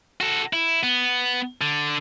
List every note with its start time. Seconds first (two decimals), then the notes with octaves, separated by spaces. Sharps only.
0.20 F#4 A4
0.53 E4
0.83 B3
1.61 D3